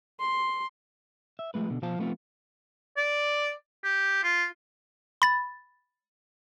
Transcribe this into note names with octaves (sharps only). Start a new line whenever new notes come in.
C6
E5
F3 G#3 A3 B4
B2 D3
B2 F3 F4 C5 F5 A5
F3 A3 B3 C4 D#4 F4
D5
G4
F4
B5 A6